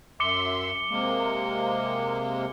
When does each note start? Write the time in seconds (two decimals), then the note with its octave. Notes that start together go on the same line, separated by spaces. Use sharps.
0.20 F#2 E5 C6 D6 C#7 G7
0.91 C3 G#3 A#3